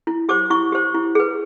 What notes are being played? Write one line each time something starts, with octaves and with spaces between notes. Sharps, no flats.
E4
G4 C5 D6
E4 C#6
G4 C5
E4
G#4 B4